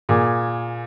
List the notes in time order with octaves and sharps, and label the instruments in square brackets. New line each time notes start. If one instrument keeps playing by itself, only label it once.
[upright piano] A#2 G#4